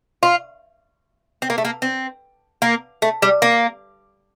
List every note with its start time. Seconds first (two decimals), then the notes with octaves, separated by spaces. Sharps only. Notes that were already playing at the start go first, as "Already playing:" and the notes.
0.23 F4
1.42 C4
1.50 A#3
1.58 A3
1.65 A#3
1.82 C4
2.62 A#3
3.02 A3
3.22 G3
3.42 A#3